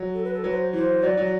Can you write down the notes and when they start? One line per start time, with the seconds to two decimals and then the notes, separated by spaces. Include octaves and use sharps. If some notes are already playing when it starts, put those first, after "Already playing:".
Already playing: F#3
0.14 A4
0.24 B4
0.34 A4
0.44 F#3 B4
0.54 C5
0.73 E3 C5
1.03 F#3 D5
1.17 F#3